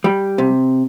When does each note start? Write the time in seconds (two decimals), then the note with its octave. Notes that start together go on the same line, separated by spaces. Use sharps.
0.04 G3
0.38 C3